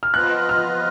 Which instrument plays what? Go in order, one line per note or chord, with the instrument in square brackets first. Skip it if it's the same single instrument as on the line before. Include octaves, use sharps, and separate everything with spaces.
[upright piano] F6
[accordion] F3 B3 F4 B4 D#5 [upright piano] F#6
[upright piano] F6